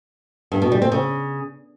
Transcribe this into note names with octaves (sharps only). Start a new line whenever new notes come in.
G2
B2
G3
C4
C#3